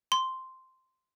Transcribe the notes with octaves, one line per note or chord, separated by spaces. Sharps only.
C6